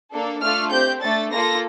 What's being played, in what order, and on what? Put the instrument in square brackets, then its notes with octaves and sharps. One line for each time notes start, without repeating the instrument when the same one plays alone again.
[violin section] A#3 D4 A4
A3 D4 F4 A4 F6
C4 G4 G6
A3 D4 A4 A6
A#3 F4 A4 A#6